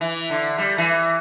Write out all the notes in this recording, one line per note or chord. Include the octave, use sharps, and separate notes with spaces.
E3
D3
G3
E3